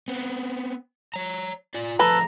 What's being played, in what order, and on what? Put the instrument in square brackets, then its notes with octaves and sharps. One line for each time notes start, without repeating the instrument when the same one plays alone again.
[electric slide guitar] B3 C4
C#5 A#5
F4 D5
[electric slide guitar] F3 A3 G#4 [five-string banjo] A4 B4 [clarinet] A#5